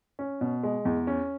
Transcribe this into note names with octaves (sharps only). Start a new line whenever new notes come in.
C#4
B2
G#3
E2
C#4